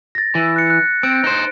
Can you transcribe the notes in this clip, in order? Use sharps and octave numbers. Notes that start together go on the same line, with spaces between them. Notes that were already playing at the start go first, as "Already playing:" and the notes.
A6 A#6
E3
F#6 C#7
F#6
C4 D7
D#4 C5